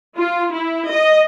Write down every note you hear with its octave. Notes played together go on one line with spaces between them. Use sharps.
F4
E4
D#5